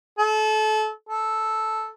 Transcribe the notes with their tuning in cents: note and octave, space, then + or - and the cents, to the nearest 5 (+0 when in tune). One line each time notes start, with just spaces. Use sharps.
A4 -30
A4 -5